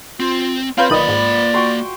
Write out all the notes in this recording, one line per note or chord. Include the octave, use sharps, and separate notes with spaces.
C4 F4
C4 F4 B4 C#5 F5 G6
B1 D#3 A#3 D5 D#5 B5
G#2
F#4 G5 C6